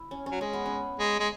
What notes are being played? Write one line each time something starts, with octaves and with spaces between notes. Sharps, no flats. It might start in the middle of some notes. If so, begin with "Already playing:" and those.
Already playing: E4
C#4
C#4
F#3
G#3 C#4
B3
C#4
G#3
G#3